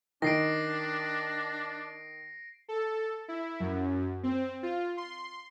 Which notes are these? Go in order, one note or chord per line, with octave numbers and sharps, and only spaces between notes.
D#3 D4 A#6 C7 D7
A4
E4
F#2
C4
F4
C6